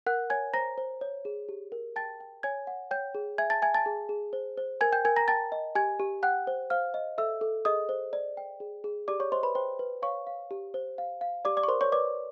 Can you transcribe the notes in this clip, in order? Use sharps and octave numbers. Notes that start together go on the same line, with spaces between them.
A#4 F#5 F#6
C#5 G#5 G#6
C5 A#5 A#6
C5
C#5
G#4
G4
A#4
G5 A5 A6
G5
C#5 G#5 G#6
F#5
C#5 G5 G6
G#4
E5 G#5 G#6
A5 A6
E5 G#5 G#6
A5 A6
G#4
G#4
C5
C5
A#4 G#5 G#6
G5 G6
A#4 G#5 G#6
A#5 A#6
G5 A5 A6
D#5
G4 G#5 G#6
G4
F#5 G5 F#6
C5
C5 F5 F6
D#5
A4 E5 E6
A4
G#4 D#5 D#6
C5
D5
G5
G#4
G#4
G4 D5 D6
C#5 C#6
C5 D#5 C6
B4 B5
C5 G5 C6
B4
C#5 F5 C#6
F5
G4
C5
F5
F5
G4 D5 D6
D5 D6
C#6
A#4 C5 C6
C#5 C#6
B4 D5 D6